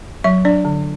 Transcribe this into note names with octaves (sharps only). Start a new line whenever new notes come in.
F#3 E5
D4 D5
D3